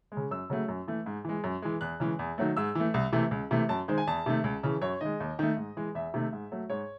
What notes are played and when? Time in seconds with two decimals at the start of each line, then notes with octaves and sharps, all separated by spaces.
0.12 G#3
0.17 C#3
0.31 F#2 E6
0.50 C#3 F#3 A3
0.68 F#2
0.88 E3 A3
1.06 G#2
1.25 E3 G#3
1.44 F#2
1.62 E3 G#3
1.81 E2 F#6
2.00 C#3 E3 G#3
2.19 E2
2.38 D#3 F#3 A3
2.57 G#2 E6
2.75 E3 A3
2.94 C2
3.13 C3 E3 A3
3.31 C#2
3.51 C3 E3 A3
3.69 F#2 A5
3.88 D#3 G#3 C5
3.98 G#5
4.07 E2 A5
4.26 C3 D#3 A3
4.44 C#2
4.63 C#3 E3
4.82 F#2 C#5
5.01 D#3 G#3 D#5
5.20 D#2
5.39 D#3 A3
5.57 G#2
5.77 E3 G#3
5.95 E2 E5
6.14 C3 D#3 A3
6.33 G#2
6.52 F#3 A3
6.70 G#2 C#5